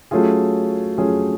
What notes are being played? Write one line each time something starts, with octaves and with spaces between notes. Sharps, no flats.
F#3 A3 C#4 F4 G#4
F#3 A3 C#4 F4 G#4